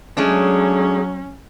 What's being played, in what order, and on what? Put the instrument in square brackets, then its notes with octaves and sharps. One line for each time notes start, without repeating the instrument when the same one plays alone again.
[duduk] F#3 [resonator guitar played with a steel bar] G#3 A3 D4 [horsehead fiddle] C#4 [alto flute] G#4